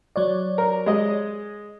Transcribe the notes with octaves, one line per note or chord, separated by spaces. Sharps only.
F#3 C#5 D5
A#4
G#3 D#5